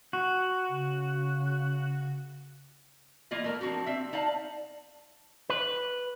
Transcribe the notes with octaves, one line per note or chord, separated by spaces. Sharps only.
F#4
C#3
E3 A#3 F4 D5 D#5
A3 A#4
F3 C4 D4 F#4 G4
C4 E5
D#4 D5 F5 A5
B4